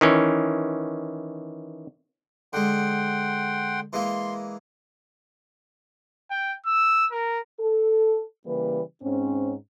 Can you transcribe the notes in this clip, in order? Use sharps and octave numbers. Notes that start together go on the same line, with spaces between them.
D#3 E3 C#4
D3 G#3 F#5 G5 C6
E3 G#3 A#3 C6
G5
E6
A#4
A4
C#3 E3 G3 A#3 B4
G#2 C4 C#4